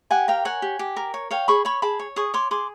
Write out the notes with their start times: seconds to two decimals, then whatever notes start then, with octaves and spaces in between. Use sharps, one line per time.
0.11 G4 F#5 G#5
0.28 A#4 F5 G5
0.45 C#5 F#5 G#5
0.62 G4
0.79 G4
0.97 A#4
1.14 C#5
1.31 C#5 F5 G5
1.48 G#4 B5 C#6
1.65 C#5 B5 C#6
1.82 G#4 A5 B5
2.00 C#5
2.16 G#4 C#6 D#6
2.34 C#5 C6 D6
2.51 G#4 C6 D6